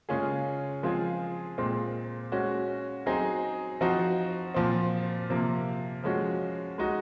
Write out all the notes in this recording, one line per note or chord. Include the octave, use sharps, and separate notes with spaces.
C#3 G#3 C#4 F4 G#4
F3 G#3 C4 F4 G#4
A#2 G#3 C4
G#3 C#4 F#4
F#3 C4 D#4 G#4
F3 C4 D#4 F#4
A#2 F3 C4
C3 F3 A#3
F3 G#3 C#4 F#4
G#3 D#4 F#4